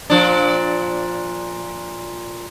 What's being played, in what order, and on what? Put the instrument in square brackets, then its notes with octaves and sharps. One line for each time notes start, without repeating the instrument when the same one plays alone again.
[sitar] A#2 F3 D4